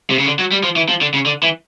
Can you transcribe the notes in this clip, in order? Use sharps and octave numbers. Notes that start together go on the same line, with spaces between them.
C3
C#3
D3
F#3
G3
F3
E3
F3
D3
C#3
D3
E3